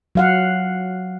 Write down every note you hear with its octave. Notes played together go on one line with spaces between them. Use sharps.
F#3 F5 F#5